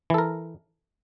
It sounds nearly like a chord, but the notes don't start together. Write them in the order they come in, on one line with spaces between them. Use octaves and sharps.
E3 A4 A#4